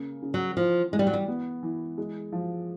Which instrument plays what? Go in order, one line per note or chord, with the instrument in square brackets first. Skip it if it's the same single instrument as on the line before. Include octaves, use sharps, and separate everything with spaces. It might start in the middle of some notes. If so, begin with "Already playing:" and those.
Already playing: [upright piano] C#3 A#3
C#3
[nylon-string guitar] F#3
[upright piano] E3 [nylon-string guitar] F3
[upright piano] E3 [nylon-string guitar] G#3
[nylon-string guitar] G3
F#3
G3
[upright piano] B3
E3
G#3
F3